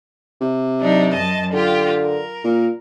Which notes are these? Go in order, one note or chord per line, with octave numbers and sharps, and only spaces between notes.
C3
F#3 D4 D#4
F#2 D#5 A5
D3 F4 G4
A#4
A#2